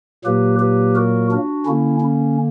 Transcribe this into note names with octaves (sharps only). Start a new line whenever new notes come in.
A#2 F#3 A#3 G4 B4
G4 B4
F#4 A#4
D4 F#4
D3 A#3 C#4 E4
C#4